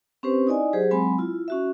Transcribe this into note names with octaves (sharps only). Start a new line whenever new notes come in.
C4 C#4 G4 B4 C5
D#4 E4 D5 D#5 G#5
F#3 G4 G#4 C5
F#3 G#3 C4 G#5 B5
E4 F4
C#4 F#4 E5